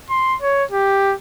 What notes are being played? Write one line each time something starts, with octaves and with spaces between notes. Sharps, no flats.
C6
C#5
G4